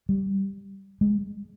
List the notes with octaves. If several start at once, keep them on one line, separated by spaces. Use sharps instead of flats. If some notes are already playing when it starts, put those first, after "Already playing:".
G3
G#3